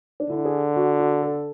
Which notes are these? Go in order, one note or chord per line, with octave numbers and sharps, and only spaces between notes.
D4
D3 E4
G#4
F#4
F#4
A4